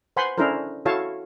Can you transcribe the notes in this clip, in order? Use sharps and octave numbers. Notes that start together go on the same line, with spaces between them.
B4 C5 F#5 G#5 B5 C6
C#4 D4 E4 A4 A#4 C5
E4 F#4 A4 C#5 F5 A5